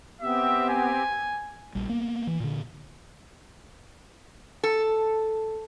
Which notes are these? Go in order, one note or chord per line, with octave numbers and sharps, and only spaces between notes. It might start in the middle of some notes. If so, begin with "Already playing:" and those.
B3 C4 G4 E5
G#5
A#1 G3
A#3 B3
E3
A#2 D3
A4